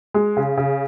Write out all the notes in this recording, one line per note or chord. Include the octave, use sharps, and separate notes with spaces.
G#3
C#3
C#3